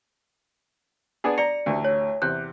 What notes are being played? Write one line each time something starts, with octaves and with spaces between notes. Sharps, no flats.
B3 D4 G#4
D5 A#5 C#7
A1 D2
C#5
E2 C3 F#6 G6